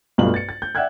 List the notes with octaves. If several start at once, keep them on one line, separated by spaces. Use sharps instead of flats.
B1 G2 A3 F4 F#7
A6 C#7
A6
G6
D5 E5 F#5 G5 F#6 G#6